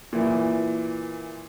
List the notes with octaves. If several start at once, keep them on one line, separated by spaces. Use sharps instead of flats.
A#2 E3